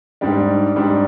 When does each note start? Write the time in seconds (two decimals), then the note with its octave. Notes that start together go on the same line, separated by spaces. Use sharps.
0.21 G#2 G3 D4
0.76 G#2 G3 D4